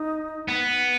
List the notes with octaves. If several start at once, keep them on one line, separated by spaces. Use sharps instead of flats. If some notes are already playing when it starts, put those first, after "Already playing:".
Already playing: D#4
B3